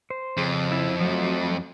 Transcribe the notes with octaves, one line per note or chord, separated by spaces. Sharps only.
C5
F2 C#3
E4
F3 F#3 A3